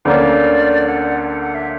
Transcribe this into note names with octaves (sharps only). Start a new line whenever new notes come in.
D2 D3 A#3 C#4 D5
F#5
F#5
F#5
E5